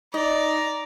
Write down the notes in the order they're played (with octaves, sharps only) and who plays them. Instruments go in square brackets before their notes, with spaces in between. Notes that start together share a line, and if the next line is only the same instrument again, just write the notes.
[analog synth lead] D#4 [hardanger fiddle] D5 [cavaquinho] D#5 [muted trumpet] A#5